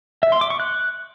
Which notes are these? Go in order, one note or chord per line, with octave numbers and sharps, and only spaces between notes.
E5
C6
D6
C#6
F#6